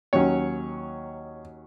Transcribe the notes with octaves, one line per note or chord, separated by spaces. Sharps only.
D#2 D#3 F#3 C#4 C#5